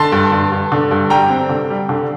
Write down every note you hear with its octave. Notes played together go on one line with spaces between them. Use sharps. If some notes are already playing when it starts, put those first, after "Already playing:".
Already playing: D3 A5 C6
G2
G2
G2
D3
G2
G3 G5 A#5
C4
D3
G3
D3